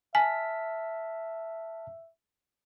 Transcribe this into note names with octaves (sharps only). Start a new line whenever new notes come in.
E5 G#5 A5 F6 B6